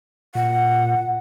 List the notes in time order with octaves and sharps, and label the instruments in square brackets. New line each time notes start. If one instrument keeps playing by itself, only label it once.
[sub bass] A#2 [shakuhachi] F#5